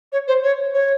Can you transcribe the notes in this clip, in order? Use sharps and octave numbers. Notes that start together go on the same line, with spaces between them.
C#5
C5
C#5
C#5